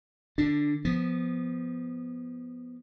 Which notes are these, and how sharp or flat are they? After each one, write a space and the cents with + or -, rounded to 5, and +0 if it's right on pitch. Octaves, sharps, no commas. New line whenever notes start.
D3 +15 D4 +0
F3 +0 B3 +0